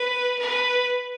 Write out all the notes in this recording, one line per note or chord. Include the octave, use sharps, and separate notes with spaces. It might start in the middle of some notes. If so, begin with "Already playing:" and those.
Already playing: B4
B4